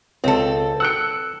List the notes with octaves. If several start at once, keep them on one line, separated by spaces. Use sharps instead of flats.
C#2 C4 A4
F#5 G5 E6 F#6 C#7